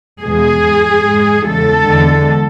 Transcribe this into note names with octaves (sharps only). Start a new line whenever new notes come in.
E2 B2 G#3 G#4
G#2 G#3
G#2 G#3
E2 C#3 G#3 A4
E2 D3 G#3